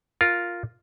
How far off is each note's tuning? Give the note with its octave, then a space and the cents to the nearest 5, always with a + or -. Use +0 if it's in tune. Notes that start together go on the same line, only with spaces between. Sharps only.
F4 +0 A#4 +0